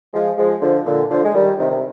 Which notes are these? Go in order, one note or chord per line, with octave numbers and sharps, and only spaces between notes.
F3 G#3
F3 G#3
D3 F3
A#2 D3
D3 F3
G#3
D#3 G3
C3 D#3
C3